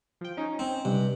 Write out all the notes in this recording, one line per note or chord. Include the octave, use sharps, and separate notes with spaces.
F3 G5
C#4 D#4
C4
G2 C3